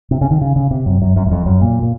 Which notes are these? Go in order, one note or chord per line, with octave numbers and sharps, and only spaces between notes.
C3
C#3
D#3
C#3
C#3
C3
F#2
F#2
F#2
F#2
F2
F#2
A#2
A#2